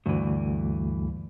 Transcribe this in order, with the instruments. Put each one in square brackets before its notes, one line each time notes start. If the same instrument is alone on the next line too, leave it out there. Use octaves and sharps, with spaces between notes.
[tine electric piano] D2 [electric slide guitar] G2 E3